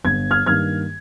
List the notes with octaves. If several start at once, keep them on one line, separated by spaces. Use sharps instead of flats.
G1 G#6
F6 G#6
G2 D#3 A#3 F6 G#6